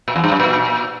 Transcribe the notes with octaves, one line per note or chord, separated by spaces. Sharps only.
A#2
E2
G2
F#2
A#2